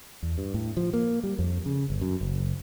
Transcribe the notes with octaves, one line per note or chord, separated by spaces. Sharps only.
E2
G2
A2
F3
A#3
G3
F2
C#3
G1
F#2
F#1